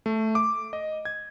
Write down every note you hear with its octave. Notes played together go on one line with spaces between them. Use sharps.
A3
D6
D#5
G#6